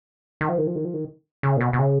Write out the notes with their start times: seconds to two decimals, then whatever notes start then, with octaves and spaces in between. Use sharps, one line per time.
0.41 D#3
0.49 F3
0.58 D#3
0.67 F3
0.76 D#3
0.85 F3
0.94 D#3
1.43 C#3
1.57 A#2
1.61 B2
1.73 B2
1.79 C#3